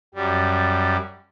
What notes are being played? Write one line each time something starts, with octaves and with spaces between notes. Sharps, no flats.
F#2 G3